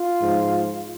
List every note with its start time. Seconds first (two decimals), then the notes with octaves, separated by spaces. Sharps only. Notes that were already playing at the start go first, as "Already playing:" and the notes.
Already playing: F4
0.21 G#2 F3